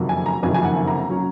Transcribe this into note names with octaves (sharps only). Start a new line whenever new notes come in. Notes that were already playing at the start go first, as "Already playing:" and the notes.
Already playing: F#1 F2 C3 D#3 F#3
G#5
A#5
F#1 F2 C3 D#3 F#3 G#5
G#5
F#5
A#5
F#3 C#4